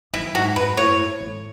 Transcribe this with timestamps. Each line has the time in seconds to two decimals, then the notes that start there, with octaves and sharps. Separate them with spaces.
0.14 F#2 E4
0.35 G#2 F#4
0.56 F#2 B4
0.77 A2 C#5
1.21 G#2